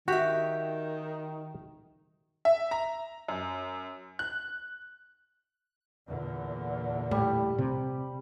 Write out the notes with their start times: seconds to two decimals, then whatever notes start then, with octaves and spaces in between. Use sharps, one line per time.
0.08 D#3 F#4 G4 E5
2.45 E5
2.71 A#5
3.28 F#2
4.19 F#6
6.06 E2 A#2 D3
7.11 A2 G3
7.58 C3